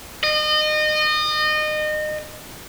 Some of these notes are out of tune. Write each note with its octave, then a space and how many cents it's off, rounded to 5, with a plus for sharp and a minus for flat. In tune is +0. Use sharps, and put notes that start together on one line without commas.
D#5 -30